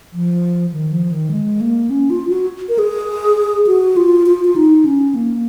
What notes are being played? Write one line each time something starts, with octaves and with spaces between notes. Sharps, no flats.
F3
D#3
F3
D#3
G#3
A#3
C#4
F4
F#4
A#4
G#4
F#4
F4
F4
F4
D#4
C#4
A#3